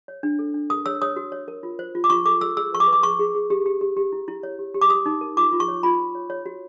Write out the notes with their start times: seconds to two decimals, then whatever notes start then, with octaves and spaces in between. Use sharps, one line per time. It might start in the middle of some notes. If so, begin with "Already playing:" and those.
0.08 C#5
0.23 D4
0.39 A4
0.54 D4
0.70 A#4 D#6
0.86 C#5 E6
1.02 C#5 D#6
1.16 F#4
1.32 C#5
1.48 A#4
1.63 F4
1.79 C5
1.95 F4
2.04 D6
2.10 F4 C#6
2.25 A4 D6
2.41 A4 E6
2.57 G#4 E6
2.72 B4 C#6
2.80 D6
2.88 B4
2.93 D6
3.03 G#4 C#6
3.19 G#4
3.35 G#4
3.50 G4
3.66 G4
3.81 G4
3.97 G4
4.12 E4
4.28 E4
4.43 C#5
4.59 G4
4.74 G4
4.81 D6
4.90 G4 D#6
5.06 D#4
5.21 A#4
5.37 F4 D6
5.52 F4
5.60 C#6
5.68 C#5
5.83 F4 B5
5.99 F4
6.15 C#5
6.30 C#5
6.46 F#4